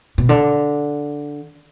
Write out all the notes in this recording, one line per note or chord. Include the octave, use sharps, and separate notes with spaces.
B2
D3